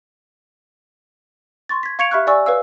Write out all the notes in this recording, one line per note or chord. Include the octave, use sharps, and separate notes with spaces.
C6 C#6 A6
G#6 B6
F5 C#6 G#6 C#7 D7 F7
G4 E5 B5 C#6 F6 F#6
D5 G#5 C#6 E6
B4 C#5 F5 E6